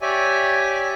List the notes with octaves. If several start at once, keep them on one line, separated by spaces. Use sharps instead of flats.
G4 C#5 D5 E5 G#5